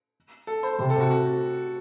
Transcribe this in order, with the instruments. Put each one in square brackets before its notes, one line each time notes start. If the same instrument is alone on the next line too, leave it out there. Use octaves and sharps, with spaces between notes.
[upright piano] A4
C5
[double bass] C3 [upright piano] C5
[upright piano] A4
F#4
F#4